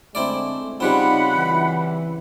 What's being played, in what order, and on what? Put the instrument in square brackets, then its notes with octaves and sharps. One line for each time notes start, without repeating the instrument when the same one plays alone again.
[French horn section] D3 G#3 A3 [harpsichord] C4 E4 D5
[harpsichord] C#3 G3 C4 [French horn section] D#4 F4 [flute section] F#5 B5
[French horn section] E3